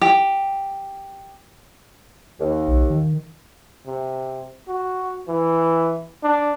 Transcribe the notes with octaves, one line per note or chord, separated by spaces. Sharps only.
G4
D#2
B1
D#3
C3
F#4
E3
D4